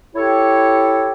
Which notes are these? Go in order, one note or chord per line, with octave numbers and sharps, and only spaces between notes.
E4 G4 A4 C#5